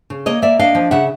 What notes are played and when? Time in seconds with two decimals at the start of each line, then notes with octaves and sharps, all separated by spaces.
0.10 C#3
0.26 A#3 C#5 D#5
0.42 A#3 D5 E5
0.59 D4 D#5 F5
0.75 F3
0.91 C#3 E5 F#5